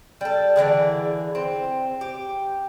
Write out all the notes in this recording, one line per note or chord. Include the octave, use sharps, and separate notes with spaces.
G3 A4
D3 E3 G#3 G#4
C4
G4